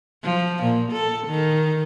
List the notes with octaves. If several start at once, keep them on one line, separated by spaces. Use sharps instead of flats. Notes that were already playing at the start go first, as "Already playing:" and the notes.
F3
A#2
A4
D#3